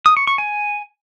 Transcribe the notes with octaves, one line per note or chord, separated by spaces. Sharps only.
D#6
C#6
C#6
G#5